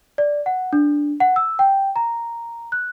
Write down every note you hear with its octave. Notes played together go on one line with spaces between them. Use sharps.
D5
F#5
D4
F#5
E6
G5
A#5
F#6